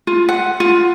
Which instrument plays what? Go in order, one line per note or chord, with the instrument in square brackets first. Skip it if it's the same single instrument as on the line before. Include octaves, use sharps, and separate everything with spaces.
[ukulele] F4
F#5
F4